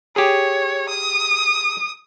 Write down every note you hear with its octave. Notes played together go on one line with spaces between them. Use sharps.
G4 G#4 C#5
D#6